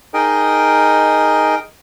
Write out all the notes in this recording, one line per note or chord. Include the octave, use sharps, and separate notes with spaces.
D#4 G#4 A#4 D#5 G5